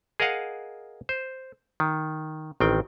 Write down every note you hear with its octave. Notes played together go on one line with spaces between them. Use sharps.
G#4 A#4 D#5 F5 F#5
C5
D#3
A1 D#3 C4 G5